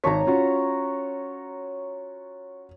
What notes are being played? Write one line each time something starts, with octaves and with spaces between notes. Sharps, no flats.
G#1 C#5 A5 A#5 B6
C#4 F4 F#4